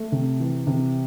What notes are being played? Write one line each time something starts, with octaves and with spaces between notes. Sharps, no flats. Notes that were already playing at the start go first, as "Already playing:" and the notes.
Already playing: A3
C3
E3
C3